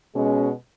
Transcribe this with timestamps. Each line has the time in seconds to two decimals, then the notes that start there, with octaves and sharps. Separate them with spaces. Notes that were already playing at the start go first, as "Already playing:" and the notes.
0.15 B2 G#3 C#4